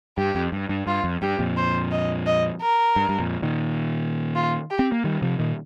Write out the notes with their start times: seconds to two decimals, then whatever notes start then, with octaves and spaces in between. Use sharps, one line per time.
0.17 G2 G4
0.35 F2
0.52 G2
0.69 G2
0.87 G2 F4
1.04 F2
1.22 G2 G4
1.39 F2 A#2
1.57 C5
1.91 D#5
2.26 D#5
2.61 A#4
2.96 G2
3.09 G2
3.19 F2 A#2
3.42 A#2 D#3
4.36 F4
4.70 G4
4.79 C4
4.92 A#3
5.04 D#3 G3
5.22 C3 F3
5.39 A#2 D#3